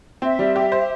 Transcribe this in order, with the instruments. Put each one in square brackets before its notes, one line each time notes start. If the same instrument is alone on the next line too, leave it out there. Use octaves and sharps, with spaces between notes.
[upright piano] C4 [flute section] E5
[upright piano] G3
G4
C5